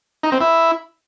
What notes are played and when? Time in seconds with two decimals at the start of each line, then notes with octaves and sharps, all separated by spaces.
0.23 D#4
0.32 C4
0.41 E4